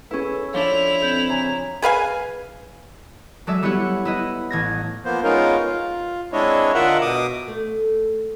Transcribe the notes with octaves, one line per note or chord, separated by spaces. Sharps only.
C#4 E4 G#4 A4 B4
F3 D4 E4 C#5 F7 G7
C4 A4 G6 G#6
C#3 G#5 A#5 G#6
G#4 B4 F5 G#5
F#3 G#3 A4 D5 E5
G3 B3 E4 G4 C#5 F#5
E4 B4 D#5
A1 G#6 A#6
F3 A#3 B3 C5
G#3 B3 C#4 D#4 F4 A#4
F4
G#3 C4 D4 E4 C#5 D#5
D3 F4 A#4 D#5 E5 F#5
B2 D6 D#6
A3